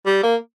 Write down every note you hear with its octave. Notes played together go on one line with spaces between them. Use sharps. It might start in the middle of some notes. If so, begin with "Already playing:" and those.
G3
A#3